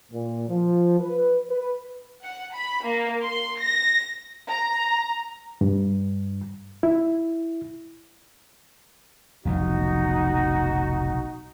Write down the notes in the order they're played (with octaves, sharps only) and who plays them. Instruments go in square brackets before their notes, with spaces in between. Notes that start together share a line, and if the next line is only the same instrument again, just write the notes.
[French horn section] A#2
F3
B4
B4
[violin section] F#5
B5
A#3
C6
A#6
[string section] A#5
[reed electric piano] G2
E4
[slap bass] F1 B1 F2 [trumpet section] D#4 F#4